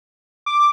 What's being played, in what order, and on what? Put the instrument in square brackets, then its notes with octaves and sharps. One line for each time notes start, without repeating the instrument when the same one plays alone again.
[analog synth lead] D6